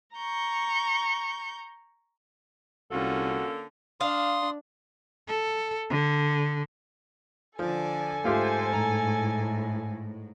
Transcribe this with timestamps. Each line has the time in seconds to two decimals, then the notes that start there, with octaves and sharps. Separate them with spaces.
0.16 A#5 C#6 G6
2.92 C2 D3 A#3 C#4 F4 F#4 A4
4.01 D4 F5 C6 D#6
5.28 A4
5.91 D3
7.59 D3 F3 A4 D5 G#5
8.24 G#2 A3 F4 G4 C5
8.73 A2 A#5